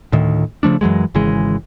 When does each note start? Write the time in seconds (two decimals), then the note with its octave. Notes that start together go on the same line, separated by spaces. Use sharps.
0.12 D2 A2 D#3
0.63 C#3 F3 A3 D4
0.81 F#2 E3 F#3 G#3
1.15 G#1 C#3 E3 G#3